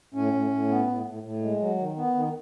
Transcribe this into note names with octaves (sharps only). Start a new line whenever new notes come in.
A2 C#4
A2
A2
B3
A2
A2
A2
G#3
F#3
D#3
B3
D#3